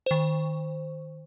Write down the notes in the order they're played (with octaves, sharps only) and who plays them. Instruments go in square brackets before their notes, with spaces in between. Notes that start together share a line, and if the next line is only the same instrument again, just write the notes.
[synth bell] D#3 C5